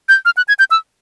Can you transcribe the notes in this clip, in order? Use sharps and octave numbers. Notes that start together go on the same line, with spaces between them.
G6
F6
F#6
G#6
G6
E6